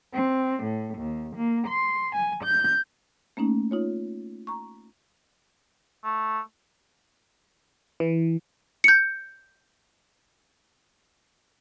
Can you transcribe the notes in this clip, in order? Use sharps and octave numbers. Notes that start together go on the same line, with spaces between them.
C4
A2
D#2
A#3
C6
G#5
G6
A3 A#3 C#4 D#4
D#4 F4 C#5
A#5 C#6
A3
E3
G6 C#7